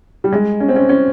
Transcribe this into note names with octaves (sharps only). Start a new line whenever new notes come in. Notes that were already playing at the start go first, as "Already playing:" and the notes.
G3
G#3
C#4
C4
C#4
C#4